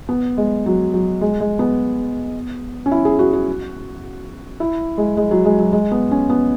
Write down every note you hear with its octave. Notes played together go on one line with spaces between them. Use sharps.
B3
G#3
F#3
F#3
G#3
G#3
B3
C#4
E4
G#4
F#4
F#4
E4
G#3
G#3
F#3
G#3
F#3
G#3
B3
C#4
B3